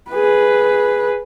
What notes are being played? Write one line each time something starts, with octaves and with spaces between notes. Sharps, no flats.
G#4 B4